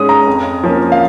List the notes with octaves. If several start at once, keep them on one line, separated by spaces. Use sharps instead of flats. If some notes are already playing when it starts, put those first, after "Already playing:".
Already playing: G#2 G#3 C#4 D#6
A#5
F2
F3 A#3 C#4
F5